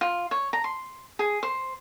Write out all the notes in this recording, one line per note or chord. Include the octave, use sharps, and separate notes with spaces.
F4
C#5
A#5
C6
G#4
C5